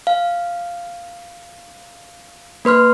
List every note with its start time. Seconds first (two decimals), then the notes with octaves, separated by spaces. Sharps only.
0.07 F5
2.65 A#3 B4 C6 F6